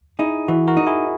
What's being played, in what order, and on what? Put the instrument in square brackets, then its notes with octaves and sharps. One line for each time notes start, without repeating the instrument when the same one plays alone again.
[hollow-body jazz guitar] D#4 [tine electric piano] E4 G#4
[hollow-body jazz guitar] E3 [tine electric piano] F#4
[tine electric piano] F#4 A#4
[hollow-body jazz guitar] D#4
[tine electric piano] E4 G#4